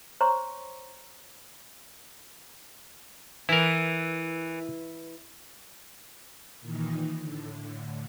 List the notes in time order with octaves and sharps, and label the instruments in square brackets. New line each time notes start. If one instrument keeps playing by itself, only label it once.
[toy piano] C5 C#5 A#5 C6 C#6
[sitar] E3 [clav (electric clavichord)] E4 A#4
[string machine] A#2 D#3 E3 D#4
A2 D3